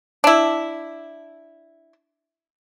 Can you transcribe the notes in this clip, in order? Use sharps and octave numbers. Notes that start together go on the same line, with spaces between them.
D4 E4